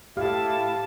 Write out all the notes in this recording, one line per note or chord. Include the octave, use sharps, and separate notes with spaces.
A2 E4 G4 F5 A5